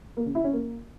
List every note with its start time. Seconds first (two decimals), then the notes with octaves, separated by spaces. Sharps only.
0.17 A#3
0.26 C#3
0.35 E4
0.44 C#4
0.53 A#3